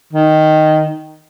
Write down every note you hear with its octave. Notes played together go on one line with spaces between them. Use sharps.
D#3